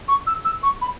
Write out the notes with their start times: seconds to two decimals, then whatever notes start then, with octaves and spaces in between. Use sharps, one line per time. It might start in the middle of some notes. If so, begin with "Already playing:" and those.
0.08 C#6
0.27 E6
0.45 E6
0.63 C#6
0.82 B5